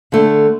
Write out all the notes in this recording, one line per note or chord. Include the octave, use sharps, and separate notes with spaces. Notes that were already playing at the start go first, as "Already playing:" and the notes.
D3 A3